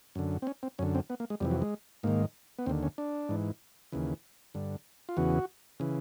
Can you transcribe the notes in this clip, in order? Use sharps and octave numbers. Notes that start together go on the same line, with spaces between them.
F#2 D3
C4
C#4
C4
F#2 D3 C#4
C4
B3
A#3
G#3
F2 C3 E3 G3
F#3
G#3
G#2 D#3 A#3
B3
D#2 D3 C4
C#4
D4
G#2 E3
D#2 C#3 E3
G2 D3
F4
E2 C#3 E3 F#4
C#3 E3